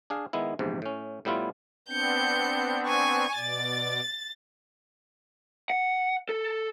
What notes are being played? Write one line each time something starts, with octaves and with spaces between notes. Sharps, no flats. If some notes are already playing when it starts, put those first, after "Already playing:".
D4 G#4 F5
D#3 G#3 B3 E4
A#1 E2 G#2 C3
A2 C#4
A2 G3 B3 E4 F4
B3 C4 D4 G6 C#7
G#5 C#6
B2 D5 A6
F#5
A4